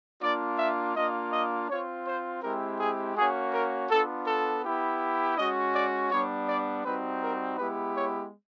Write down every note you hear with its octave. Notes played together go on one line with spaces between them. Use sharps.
A#3 D4 F4 D5
E5
A#3 D4 F4 D#5
D#5
C4 F4 C#5
C5
G#3 C4 E4 G4 A#4
G#4
A#3 C#4 F#4 G#4
A#4
B3 D4 F4 A4
A4
B3 E4 G4
G#3 C#4 F#4 D#5
D5
G3 B3 D4 C#5
D5
G3 C4 D#4 F#4 B4
A#4
G#3 B3 E4 G4 B4
C#5